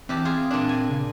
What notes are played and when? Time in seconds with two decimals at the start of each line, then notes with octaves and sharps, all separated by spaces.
0.09 E2 C4 G4 A5
0.25 F4 G#4
0.51 A#2 D4
0.69 G#5
0.89 C#3